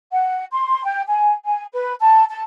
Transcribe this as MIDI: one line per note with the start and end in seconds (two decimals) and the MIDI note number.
0.12 0.45 78
0.53 0.84 84
0.85 1.03 79
1.08 1.33 80
1.45 1.64 80
1.72 1.94 71
2.00 2.25 81
2.30 2.42 81